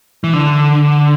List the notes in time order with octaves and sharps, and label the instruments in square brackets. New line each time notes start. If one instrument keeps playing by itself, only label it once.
[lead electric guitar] E3
D3